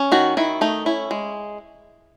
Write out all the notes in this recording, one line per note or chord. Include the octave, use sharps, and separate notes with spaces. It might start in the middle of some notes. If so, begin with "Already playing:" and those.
Already playing: C#4
D#3 F#4
D#3 E4
A3 D#4
C#4 E4
G#3